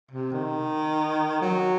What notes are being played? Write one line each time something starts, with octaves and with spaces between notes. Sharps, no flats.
C3
D#3
F#3